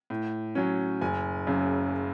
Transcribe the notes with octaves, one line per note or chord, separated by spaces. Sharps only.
A2
F#3 C#4
F#1 G#5
F#2 C#3